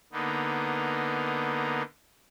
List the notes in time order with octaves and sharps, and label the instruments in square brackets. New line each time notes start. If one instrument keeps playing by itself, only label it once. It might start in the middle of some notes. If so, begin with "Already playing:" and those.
[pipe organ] D3 A#3 B3 D#4